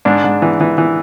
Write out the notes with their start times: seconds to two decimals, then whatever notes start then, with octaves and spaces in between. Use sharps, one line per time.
0.05 G#2 D4
0.24 G#2
0.42 E3
0.61 E3
0.78 E3